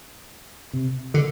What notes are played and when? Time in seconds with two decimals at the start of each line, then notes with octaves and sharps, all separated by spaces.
0.73 C3
1.14 D3